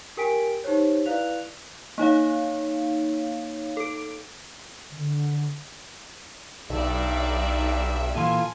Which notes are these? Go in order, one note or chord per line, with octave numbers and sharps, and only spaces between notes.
G4 A#4 G5 G#5 B6 D7
D#4 G4 C5 C#5
E4 B4 D5 F5 F#6 F7
A#3 D#4 C#5 F5
A4 D7
D3
B1 G2 D#4 D5 E5
A#2 E3 F4 A4 G#5